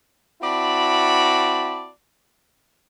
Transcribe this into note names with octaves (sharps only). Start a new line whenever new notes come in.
C4 E4 F#4 D5 A5 B5